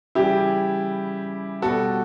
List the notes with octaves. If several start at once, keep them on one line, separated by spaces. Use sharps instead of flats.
C#3 E3 G3 E4 G4
B2 G3 F#4 A4